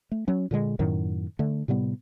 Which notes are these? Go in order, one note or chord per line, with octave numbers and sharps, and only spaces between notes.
A3
F#3 C#4
A#2 D3 G#3
F#2 A2 D#3 F#3
D3 A3
A2 C3 G3 B3